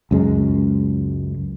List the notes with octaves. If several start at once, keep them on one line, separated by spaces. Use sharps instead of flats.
C#2 F#2 G#3